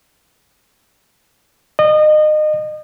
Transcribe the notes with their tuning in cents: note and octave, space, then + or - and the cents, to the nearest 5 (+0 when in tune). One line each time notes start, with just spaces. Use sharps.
D#5 -30